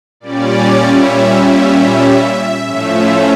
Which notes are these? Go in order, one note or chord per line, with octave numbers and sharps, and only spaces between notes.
A#2 G3 C#4 D5
E5
E5
A2 F3 A3 C#4 E5